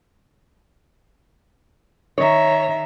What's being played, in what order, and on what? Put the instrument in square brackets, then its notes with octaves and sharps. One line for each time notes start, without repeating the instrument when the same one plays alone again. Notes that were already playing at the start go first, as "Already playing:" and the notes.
[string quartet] D#3 E5 A#5 [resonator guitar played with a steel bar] C#5